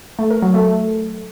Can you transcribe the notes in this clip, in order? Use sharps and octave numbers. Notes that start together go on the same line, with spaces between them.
A3
A#4
F#3
A3